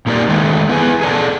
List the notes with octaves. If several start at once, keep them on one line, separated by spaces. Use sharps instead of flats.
A#2 A#3 D#4 G4 D5
D#3 G#3 A3
B3 E4 G#4 B4 G5 G#5
G#4 A4 D5 A5